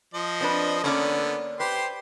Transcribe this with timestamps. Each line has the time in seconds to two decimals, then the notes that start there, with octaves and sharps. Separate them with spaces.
0.14 F3 D#5
0.41 C4 D4 B4
0.84 D3 A#3 B3 C#4 D5
1.60 G4 B4 C5 C6